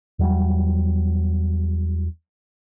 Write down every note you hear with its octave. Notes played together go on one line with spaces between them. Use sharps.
E2 F#3 G3